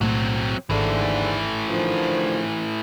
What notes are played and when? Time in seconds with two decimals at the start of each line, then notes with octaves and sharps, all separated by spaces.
0.01 B1 A2 F#3 A3 C4
0.70 G#1 D#2 G#2 D3 E3 A3
1.69 D3 D#3 F3